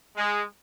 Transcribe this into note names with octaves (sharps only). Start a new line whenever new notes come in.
G#3